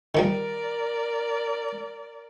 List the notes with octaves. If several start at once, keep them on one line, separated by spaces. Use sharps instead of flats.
D#3 F3 G3 A#4 D5